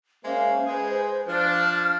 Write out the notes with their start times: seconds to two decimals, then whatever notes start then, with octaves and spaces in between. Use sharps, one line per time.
0.25 G#3 A#3 C#4 C5 E5 F5
0.66 G#3 G#4 B4
1.28 F3 D4 F6